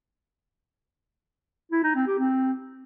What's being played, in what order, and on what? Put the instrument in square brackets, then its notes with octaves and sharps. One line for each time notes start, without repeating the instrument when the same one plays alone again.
[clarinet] E4
D#4
C4
G4
C4